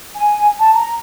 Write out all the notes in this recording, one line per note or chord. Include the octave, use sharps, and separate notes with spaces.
G#5
A5
A#5